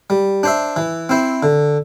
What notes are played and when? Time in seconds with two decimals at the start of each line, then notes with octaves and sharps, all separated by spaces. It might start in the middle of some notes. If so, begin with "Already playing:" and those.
0.10 G3
0.43 D4 C5 E5
0.76 E3
1.09 C4 E4 C5
1.43 D3